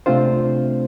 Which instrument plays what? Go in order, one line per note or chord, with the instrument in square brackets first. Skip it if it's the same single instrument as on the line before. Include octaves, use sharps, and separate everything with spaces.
[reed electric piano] C3 A3 C4 D4 F4 C5